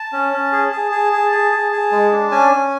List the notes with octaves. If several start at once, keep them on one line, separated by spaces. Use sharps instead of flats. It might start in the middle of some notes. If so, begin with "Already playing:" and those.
Already playing: A5
C#4
C#4
G#4
G#4
G#4
G#4
G#4
G#4
G#4
G#3
D4
C#4 G#5
C#4